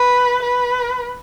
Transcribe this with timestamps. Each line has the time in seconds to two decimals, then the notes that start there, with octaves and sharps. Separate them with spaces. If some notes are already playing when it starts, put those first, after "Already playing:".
Already playing: B4
0.42 B4